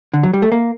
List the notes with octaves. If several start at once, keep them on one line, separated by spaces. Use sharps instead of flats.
D3
F#3
G3
A3
A#3